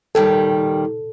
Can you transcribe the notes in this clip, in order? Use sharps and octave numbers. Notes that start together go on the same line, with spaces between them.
D#2 D#3 G3 A4